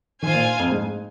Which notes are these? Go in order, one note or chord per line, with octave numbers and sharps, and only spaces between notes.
D#3 F4 C5 F5 G#5
A#2
F2
G#2